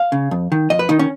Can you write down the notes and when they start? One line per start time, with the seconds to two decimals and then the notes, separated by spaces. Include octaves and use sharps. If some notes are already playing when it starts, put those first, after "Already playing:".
Already playing: F5
0.12 C#3
0.31 F2
0.52 D#3
0.70 F2 D#5
0.79 B4
0.89 D#3 D#4
0.99 C#4